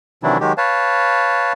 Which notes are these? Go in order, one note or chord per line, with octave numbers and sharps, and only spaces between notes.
C3 D#3 E3 F#3 D4 E4
D#3 F#3 G#3 G4
B4 C#5 F5 A5